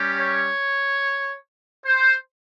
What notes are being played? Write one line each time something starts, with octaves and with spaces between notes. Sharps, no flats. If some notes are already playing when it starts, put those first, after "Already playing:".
Already playing: G3 C#4 G4
C#5
C5